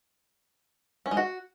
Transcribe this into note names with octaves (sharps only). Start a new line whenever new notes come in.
C#4
G#3
F#4